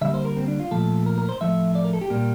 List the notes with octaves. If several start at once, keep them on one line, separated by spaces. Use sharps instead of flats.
D3 G3 A#3 E5
C5
A#4
C4
D4
F4
A#2 F3 A3 A4
A#4
A#4
C5
A2 F3 A3 E5
D5
A#4
A4
G4
A#2 G3 A#3